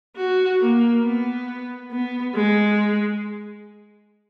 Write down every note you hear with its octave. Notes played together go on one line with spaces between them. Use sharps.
F#4
A#3
B3
B3
G#3